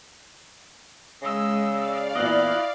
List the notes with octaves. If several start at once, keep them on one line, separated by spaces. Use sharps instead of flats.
C#3 G#3 D#5 E6
D5 F5
E2 A#2 E4 D#5 F#6